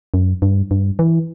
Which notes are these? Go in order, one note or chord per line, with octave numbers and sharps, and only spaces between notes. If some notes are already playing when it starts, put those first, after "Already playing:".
F#2
G2
G2
E3